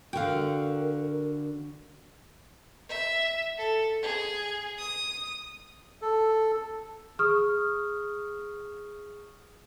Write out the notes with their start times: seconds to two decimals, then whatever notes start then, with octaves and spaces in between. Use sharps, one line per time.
0.13 D3 F#4 A#4 F5 G5
2.89 E5
3.58 A4
4.03 G#4
4.78 D#6
6.02 A4
7.19 G#4 C#6 D#6 F6